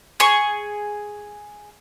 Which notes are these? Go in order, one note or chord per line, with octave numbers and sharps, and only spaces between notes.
G#4 C#6